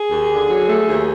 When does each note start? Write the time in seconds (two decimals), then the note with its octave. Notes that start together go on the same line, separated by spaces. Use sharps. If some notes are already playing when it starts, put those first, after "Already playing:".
Already playing: G#4
0.10 D#2
0.30 D3
0.48 F#3
0.68 A3
0.88 D#2